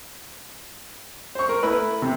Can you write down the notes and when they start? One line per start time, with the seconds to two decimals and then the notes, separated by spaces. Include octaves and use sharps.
1.35 C5 C#6
1.49 A#4
1.63 A3 E4 A#4 B4
2.02 C3